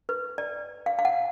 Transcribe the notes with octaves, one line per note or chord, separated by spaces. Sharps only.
B4
D5
F5
F5
F#5